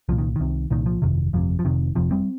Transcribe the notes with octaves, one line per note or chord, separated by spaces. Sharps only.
C2 A#2 F3
D#3
C2 C3 D#3
C2 A#2 D#3
F3
G1 F2 C3 D#3
G1 F2 C3 F3
F3
F1 F2 C3 D#3
F1 F2 C3 F3
G3 C4